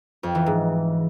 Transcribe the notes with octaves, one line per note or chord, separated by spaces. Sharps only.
F2
E3
G#2